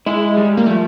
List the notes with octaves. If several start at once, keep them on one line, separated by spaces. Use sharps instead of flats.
G#3 E4
G3
A#3
F3 A3